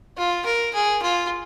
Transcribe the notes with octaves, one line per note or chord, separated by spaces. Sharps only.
F4
A#4
G#4
F4